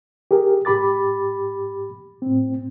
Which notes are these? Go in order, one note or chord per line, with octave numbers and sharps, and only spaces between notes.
G4 G#4 A#4
G#2 G4 B5 D6 A6
A2 C4